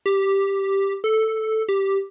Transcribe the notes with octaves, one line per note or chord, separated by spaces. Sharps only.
G4
A4
G4